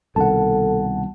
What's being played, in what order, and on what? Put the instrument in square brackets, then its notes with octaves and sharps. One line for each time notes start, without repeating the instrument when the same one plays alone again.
[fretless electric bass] C2 B2 D#3 [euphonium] A4 [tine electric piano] F#5 A5